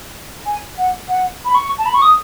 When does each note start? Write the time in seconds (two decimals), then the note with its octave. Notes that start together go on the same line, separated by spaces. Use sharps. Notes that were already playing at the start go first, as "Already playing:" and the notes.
0.46 G#5
0.78 F#5
1.09 F#5
1.45 B5
1.55 C#6
1.78 A5
1.86 B5
1.94 C#6
2.02 D#6